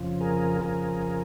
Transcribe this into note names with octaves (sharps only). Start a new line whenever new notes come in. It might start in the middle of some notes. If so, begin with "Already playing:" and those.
Already playing: F2 C#3 F3
G#4 A#4
F2 C#3 F3 G#4 A#4